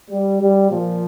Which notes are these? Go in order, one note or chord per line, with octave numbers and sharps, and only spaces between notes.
G3
G3
A#2 F3